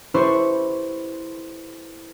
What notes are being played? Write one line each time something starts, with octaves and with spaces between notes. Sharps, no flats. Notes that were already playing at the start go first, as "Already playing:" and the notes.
E4 G4 A4 B4 C5 C#6